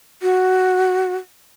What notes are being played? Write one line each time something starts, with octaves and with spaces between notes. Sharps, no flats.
F#4